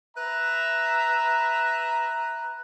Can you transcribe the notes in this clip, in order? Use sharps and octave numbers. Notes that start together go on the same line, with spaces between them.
B4 E5 A#5